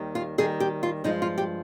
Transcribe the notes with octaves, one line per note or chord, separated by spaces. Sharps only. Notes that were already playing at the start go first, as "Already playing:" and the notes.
Already playing: D#2 D#3 G3
F4
D#2 D#3 G3 G#4
G4
F4
G2 F3 G#3 D#4
F4
G4